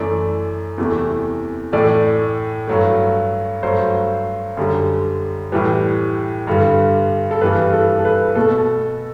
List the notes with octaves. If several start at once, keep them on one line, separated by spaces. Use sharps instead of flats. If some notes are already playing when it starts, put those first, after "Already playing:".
Already playing: F#2 E3 A3 D5
E2 C3 E3 A3
A2 E3 A3 D5
G2 F#3 A3
G2 F#3 A3 C5
F#2 D3 G3
A2 E3 G3 B4
G2 D3 G3
A4
G2 E3 G3 B4
A4
A4
B4
B2 A3 A4